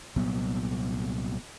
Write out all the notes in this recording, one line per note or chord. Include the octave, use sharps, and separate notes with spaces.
C2 A#2 F#3 B3